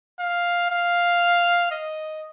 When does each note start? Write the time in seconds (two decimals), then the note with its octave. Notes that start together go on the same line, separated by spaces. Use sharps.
0.19 F5
0.71 F5
1.71 D#5